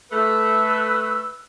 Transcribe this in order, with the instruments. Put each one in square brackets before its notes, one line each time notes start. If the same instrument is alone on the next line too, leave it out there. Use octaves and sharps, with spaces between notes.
[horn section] A3 [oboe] B4 [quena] E6